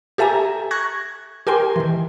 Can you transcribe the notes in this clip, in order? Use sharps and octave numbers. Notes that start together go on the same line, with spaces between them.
G4 A4 E5 G#5 A#5
C#6 F#6 G#6 A#6
G4 A#4 G5 G#5 C6
D#3 E3